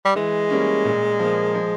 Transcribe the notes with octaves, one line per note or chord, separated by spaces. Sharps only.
G3
E3 G#3
G3 A#3 C#4
A#2
F3 A#3
F3